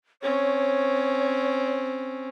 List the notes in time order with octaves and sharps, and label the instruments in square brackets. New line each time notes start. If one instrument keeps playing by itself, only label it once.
[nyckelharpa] C4 C#4 [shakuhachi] C#5